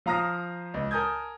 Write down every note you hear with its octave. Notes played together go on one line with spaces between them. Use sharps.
F3 F5 A#5 D#6 F6 A#6
C#2
A#4 G#5 A5 D#6 G6 G#6